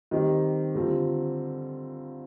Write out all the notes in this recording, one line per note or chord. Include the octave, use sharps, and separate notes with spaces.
D#3 G3 C4 G4
D3 G3 C4 F4